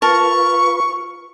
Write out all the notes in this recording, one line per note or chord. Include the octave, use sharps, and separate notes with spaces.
F4 A#4 B4 A5 C#6